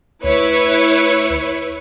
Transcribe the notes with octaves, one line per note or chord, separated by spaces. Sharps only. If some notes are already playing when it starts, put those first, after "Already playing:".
D2 E4 B4 C#5